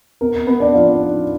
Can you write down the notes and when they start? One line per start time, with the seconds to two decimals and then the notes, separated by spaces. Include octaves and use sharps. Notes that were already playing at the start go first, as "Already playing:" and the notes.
0.21 B3 A#4
0.34 A#4
0.47 B3 B4
0.60 D4 D5
0.74 F3 F4 F5
1.00 D#4